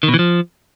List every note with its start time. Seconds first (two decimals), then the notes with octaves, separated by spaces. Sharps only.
0.03 D#3
0.08 B2
0.14 E3
0.19 F3